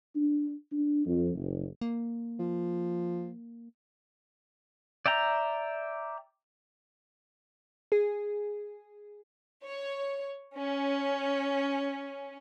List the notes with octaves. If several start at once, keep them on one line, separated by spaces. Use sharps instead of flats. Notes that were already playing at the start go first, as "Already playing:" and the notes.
D4
D4
F2
F#1
A#3
F3
D5 E5 G5 A#5
G#4
C#5
C#4